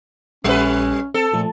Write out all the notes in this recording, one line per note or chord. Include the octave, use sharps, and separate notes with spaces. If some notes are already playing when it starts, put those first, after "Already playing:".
A#1 G3 C#4 B4 E5
C4 A4
A#2 F3 A3